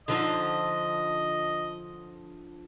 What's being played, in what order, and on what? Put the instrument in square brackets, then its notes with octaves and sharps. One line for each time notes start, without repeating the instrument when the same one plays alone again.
[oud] D3 F3 D#4 [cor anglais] D#5